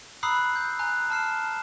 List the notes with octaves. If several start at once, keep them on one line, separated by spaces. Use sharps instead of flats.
A#5 B5 D#6 E6 F#6 C7
G6
G#5 A#5 F#6
A5 F6 C7 E7